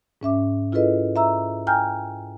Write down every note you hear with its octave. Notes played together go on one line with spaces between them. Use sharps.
G#2 C#4 E5 D6
E4 F4 G#4 A4 B4 D#5
E5 A#5 E6
G5 G#5 A#5 F6 G6